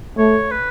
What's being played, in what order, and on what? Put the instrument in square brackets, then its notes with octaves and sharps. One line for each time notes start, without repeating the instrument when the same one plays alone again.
[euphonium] A3 [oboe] C#5
[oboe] B4